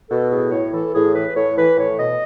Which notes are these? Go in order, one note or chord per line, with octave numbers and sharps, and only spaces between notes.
B2 A4
A2 G#4
A2 C#5
E3 A4
A2 G#4
E3 B4
A2 C#5
E3 B4
A2 C#5
B2 D#5